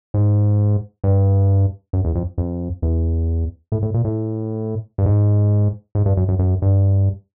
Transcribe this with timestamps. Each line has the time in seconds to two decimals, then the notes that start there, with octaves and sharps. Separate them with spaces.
0.14 G#2
1.04 G2
1.93 F#2
2.04 E2
2.15 F2
2.38 F2
2.82 E2
3.72 A2
3.82 A2
3.94 A#2
4.05 A2
4.98 G2
5.06 G#2
5.95 G#2
6.06 G2
6.17 F#2
6.28 F#2
6.39 F#2
6.62 G2